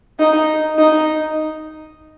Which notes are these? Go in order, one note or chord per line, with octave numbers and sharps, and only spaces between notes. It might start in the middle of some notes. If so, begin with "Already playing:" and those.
D#4
D#4